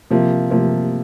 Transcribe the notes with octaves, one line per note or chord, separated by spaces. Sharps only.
C3 F3 A#3
C3 F3 A#3